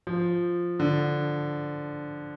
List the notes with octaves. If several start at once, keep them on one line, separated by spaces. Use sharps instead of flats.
F3
D3